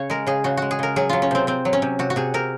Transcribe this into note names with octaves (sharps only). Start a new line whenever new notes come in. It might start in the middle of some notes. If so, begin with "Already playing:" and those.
Already playing: C#3 C#5
G#3 A#4
C#3 G#4
C#3 F#4
G#3 F#4
G#4
C#3 A#4
F#3 G#4
F#3 F4
C#4
C3 C4
C3 C4
F#3
C#4
C3
C3 F#4
F#4
C3 G#4
C3 A#4